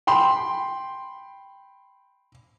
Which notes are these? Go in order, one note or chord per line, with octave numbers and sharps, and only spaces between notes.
G5 B5 C6